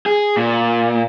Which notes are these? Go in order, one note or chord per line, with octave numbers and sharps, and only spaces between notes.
G#4
A#2